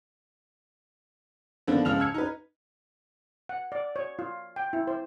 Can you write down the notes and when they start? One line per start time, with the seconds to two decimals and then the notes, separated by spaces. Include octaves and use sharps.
1.67 D3 D#3 F3 B3 C4 D4
1.85 C#2 C#3 F3 F6 F7
2.00 E6 G#6 C#7
2.14 D#4 B4
3.49 F#5
3.72 D5
3.96 C#5
4.19 F4
4.56 G5
4.73 E4
4.87 C5